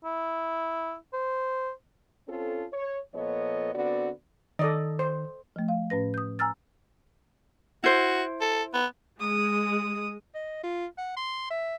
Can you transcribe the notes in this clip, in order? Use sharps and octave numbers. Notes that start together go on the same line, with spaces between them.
E4
C5
C4 C#4 F4 A4
C#5
A#2 F3 B3 A4 C#5 D#5
D3 B3 C4 F#4 D5
D#3 A4 D5 D#5
C5
F3 A3
F5
A2 C#4 B4 A#6
D#6 G6
G#5 A#5 E6 F6 A6
E4 F#4 C5
A4
B3
G#3 D#6
D#5
F4
F#5
C6
E5